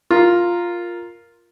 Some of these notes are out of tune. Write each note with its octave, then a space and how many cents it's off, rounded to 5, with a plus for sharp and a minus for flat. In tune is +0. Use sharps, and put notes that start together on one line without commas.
F4 +0 A#4 +0